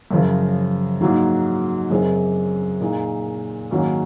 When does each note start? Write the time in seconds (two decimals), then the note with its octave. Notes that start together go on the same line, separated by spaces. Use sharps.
0.11 F#2 C#3 F3
1.01 G#2 F#3 A#3
1.90 F#2 C#3 G#3 C4
2.81 A#2 G#3 D#4
3.71 G#2 D#3 F#3 A#3 C#4